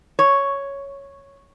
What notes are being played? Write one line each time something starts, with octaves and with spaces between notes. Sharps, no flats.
C#5